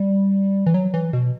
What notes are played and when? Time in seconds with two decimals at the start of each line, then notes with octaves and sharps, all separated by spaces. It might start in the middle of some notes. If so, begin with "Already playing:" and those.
Already playing: G3
0.66 E3
0.74 F#3
0.94 E3
1.13 B2